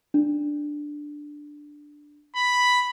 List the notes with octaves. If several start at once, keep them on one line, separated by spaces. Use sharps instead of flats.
D4
B5